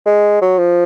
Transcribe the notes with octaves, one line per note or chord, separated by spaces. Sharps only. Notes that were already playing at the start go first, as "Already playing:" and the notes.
G#3
F#3
F3